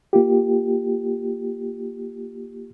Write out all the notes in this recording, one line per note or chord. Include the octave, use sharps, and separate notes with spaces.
A#3 F4 G4